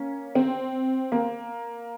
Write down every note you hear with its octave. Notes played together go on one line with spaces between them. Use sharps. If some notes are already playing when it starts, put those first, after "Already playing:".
Already playing: A#3 C#4
C4
A#3